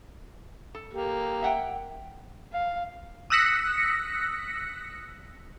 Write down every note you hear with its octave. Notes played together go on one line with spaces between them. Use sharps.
A4
A#3 G4
E5 F#5 G5
F5
D#6 E6 F#6 A#6 B6 C#7